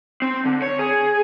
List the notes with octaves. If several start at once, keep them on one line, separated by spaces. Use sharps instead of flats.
C4
D3
C#5
G#4